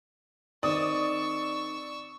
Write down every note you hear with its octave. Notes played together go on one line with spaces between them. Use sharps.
D#3 C4 D5 C#6 D#6 E6